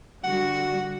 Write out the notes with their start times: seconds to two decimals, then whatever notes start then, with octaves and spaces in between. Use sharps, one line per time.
0.24 D3 G3 F#4 F#5